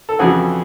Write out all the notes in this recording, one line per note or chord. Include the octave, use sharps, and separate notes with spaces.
A4
F2 C#3 E3 F#4 G#4